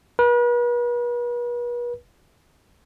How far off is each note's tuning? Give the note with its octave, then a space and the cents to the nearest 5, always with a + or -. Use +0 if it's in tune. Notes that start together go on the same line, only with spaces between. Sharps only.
B4 -40